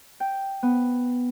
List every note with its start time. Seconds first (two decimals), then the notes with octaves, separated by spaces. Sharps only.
0.20 G5
0.63 B3